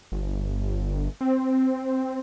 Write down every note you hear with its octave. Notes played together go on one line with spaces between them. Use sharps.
G1
C4